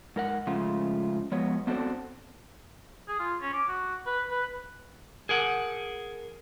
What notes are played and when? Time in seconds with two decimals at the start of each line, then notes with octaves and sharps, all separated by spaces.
0.16 G#2 A#4 F#5
0.47 C#3 F3 G#3 A3 F4
1.32 F3 G#3 B3 F#4 C#5
1.67 B3 C4 D4 F#4 A4 C5
3.08 G#4
3.20 F4
3.41 C#4
3.53 D6
3.68 F#4
4.06 B4
4.31 B4
5.29 G#4 A#4 F#5